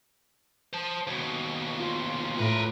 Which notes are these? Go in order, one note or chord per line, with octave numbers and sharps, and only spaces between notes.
C5 A5
D#2 B2
F4
A2 A#4 B4